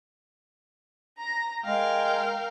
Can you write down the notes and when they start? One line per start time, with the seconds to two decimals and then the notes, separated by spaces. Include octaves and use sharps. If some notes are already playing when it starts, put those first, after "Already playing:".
1.18 A#5 A#6
1.65 G#3 A#4 F5 G5